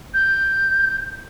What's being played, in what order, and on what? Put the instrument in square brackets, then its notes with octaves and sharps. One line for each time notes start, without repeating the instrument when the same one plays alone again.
[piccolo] G6